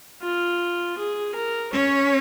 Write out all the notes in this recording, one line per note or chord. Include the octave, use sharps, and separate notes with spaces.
F4
G#4
A#4
C#4 C#5